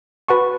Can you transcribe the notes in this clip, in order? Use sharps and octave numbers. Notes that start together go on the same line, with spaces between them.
F#4 B4 F#5 A5 C#6